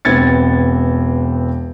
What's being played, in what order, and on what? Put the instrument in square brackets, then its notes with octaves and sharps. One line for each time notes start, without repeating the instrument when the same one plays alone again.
[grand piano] E1 B3 C4 G#6 A6 C#7